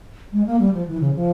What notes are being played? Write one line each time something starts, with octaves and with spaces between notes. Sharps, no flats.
G#3
A#3
G3
F3
E3
C#3
F3